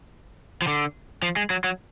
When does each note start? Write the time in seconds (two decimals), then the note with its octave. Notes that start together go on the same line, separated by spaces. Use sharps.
0.62 F3
0.68 D3
1.22 F3
1.36 G#3
1.50 F#3
1.64 F#3